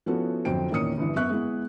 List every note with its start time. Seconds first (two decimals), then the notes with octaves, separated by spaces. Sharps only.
0.06 F3 B3 C#4 E4 F#4 A4
0.45 G1 F2 F#3 C5 G5 D7
0.71 E2 A#2 D#3 C#4 D#6 C#7
0.98 G1 G2 E3
1.16 F#2 B3 E5 C#6 F#6
1.29 G#3 B3 E4